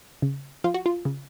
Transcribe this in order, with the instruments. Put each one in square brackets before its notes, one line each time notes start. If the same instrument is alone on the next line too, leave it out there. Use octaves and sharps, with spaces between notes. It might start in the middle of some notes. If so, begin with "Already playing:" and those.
[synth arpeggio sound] C#3
F3 F4
F#4
F4
C#3